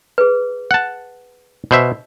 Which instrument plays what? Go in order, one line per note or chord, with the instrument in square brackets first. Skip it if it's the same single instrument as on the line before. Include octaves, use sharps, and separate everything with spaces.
[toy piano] G#4 B4
[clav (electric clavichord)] F#5 A5
B2 C5 E5